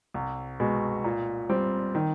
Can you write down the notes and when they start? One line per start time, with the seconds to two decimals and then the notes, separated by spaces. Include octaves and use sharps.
0.14 C2
0.60 B2 G#3
1.04 A#2
1.49 G3 C4
1.95 D#3